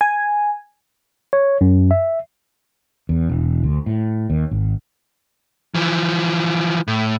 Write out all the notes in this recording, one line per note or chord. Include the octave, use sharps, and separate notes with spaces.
G#5
C#5
F#2
E5
E2
E1
D2
A2
D#2
G#1
E3 F3
A2